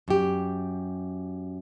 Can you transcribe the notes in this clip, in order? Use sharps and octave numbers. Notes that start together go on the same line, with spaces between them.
F#2 G4